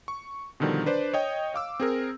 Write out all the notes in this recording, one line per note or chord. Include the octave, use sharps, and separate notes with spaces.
C#6
B2 D3 D#3 F3 G3
D4 B4 C5 D5
C#5 D#5 G5
F5 D6 E6
C4 G#4 A#4